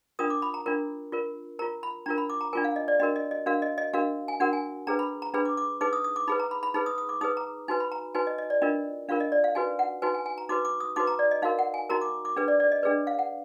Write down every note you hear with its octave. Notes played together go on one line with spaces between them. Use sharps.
D4 F4 A#4 D#6
D6
B5
A#5
D4 F4 A#4
F4 A#4
F4 A#4 A#5
B5
D4 F4 A#4 A#5
B5
D6
A#5
D4 F4 A#4 G#5
F5
D#5
D5
D4 F#4 A#4 D#5
D#5
D#5
D4 F#4 A#4 F5
D#5
D#5
D4 F#4 A#4 F5
G#5
D4 F#4 A#4 F#5
G#5
D4 G#4 B4 A#5
B5
A#5
D4 G#4 B4 B5
D6
D6
D#4 G#4 B4 D6
D#6
D#6
D6
D#4 G#4 B4 B5
A#5
B5
B5
D#4 G#4 B4 B5
D#6
D#6
D6
D#4 G#4 B4 D#6
A#5
D#4 F#4 B4 G#5
B5
A#5
D#4 F#4 B4 G#5
D#5
D#5
D5
D4 F4 A#4 D#5
D4 F4 A#4 F5
D#5
D5
F5
D#4 F#4 B4 G#5
F#5
D#4 F#4 B4 G#5
G#5
G#5
A#5
D#4 F#4 B4 D6
D6
D#6
D#4 F#4 B4 D6
A#5
D5
D#5
D#4 F#4 A#4 F5
F#5
G#5
D#4 F#4 A#4 A#5
D6
D6
D4 G#4 B4
D5
D5
D#5
D4 G#4 B4 D5
F5
F#5